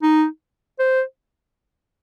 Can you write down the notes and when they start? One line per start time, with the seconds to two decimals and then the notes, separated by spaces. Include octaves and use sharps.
0.03 D#4
0.79 C5